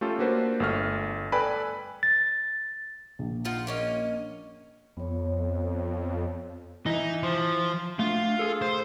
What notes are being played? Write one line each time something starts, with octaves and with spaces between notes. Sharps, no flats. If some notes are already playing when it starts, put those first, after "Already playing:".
A3 C#4 F4 G4 A4
A#3 D4 F#4 B4 C5
G1 A3 F6
A4 B4 D5 G5 G#5 B5
A6
A#1
D#4 F4 F#5
A#3 C#4 D#5
F2 B3 C#5
E3 D#4 E4
F3
A3 D4 F4
G#4 A4
C5